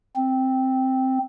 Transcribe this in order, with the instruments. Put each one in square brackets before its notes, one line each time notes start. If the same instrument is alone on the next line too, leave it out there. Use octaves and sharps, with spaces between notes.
[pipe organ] C4